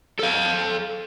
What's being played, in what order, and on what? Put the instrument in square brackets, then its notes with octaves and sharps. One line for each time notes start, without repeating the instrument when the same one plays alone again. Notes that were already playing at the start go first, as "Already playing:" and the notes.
[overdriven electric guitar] A4 F5